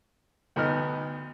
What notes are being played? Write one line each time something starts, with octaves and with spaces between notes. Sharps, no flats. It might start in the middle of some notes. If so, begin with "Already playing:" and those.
D2 G2 B3 D#4 D#5 F6